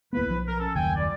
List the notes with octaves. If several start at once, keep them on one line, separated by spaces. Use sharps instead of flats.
D1 A#3 B3 E4 B4
B1 F3
A#4
C#4 A4
F#1 D#2 D#3 G5 G#5
A#2 G3 D5